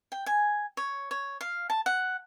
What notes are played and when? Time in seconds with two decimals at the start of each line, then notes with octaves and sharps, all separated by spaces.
0.12 G5
0.26 G#5
0.77 C#5
1.11 C#5
1.41 F5
1.70 A5
1.86 F#5